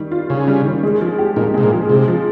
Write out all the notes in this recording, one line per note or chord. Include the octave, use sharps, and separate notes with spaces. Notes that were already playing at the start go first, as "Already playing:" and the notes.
Already playing: D#3 G3
F4
C#3 C#4
G3
D#3
G#3
F3
G4
A#2 D#4
C3 G#3
A#2
F3
C3 G#3
F3